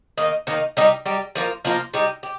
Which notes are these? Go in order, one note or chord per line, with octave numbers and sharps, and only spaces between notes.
D#3 A#3 D#4
D#3 A#3 D#4
G3 D#4 G4
G3 D#4 G4
F3 A#3 F4
F3 A#3 F4
G3 D#4 G4
G4